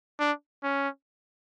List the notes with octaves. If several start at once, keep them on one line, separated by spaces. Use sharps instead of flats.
D4
C#4